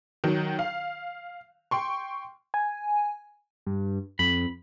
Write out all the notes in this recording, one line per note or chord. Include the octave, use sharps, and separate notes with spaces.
D#3 F#3
F5
G5 C6 C#6
G#5
G2
F2 B5